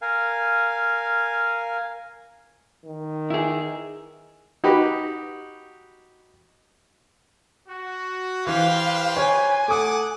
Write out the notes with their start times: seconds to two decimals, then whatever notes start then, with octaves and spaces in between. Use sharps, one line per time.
0.02 A#4 F5 G#5
2.85 D#3
3.30 E4 G#4
4.64 D#4 F#4 G4 B4 B5
7.68 F#4
8.47 E3 G4 B4 C5 F5
9.17 C#5 G#5
9.68 A3 F#5 D6 D#6